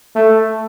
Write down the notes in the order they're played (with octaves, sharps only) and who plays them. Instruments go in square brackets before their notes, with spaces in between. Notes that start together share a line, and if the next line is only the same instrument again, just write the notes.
[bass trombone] A3